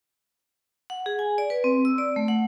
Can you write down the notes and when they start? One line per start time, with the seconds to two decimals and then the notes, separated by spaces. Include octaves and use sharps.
0.90 F#5
1.06 G#4
1.19 G#5
1.38 D5
1.50 B4
1.64 C4
1.85 E6
1.98 D5
2.16 A3
2.28 F#5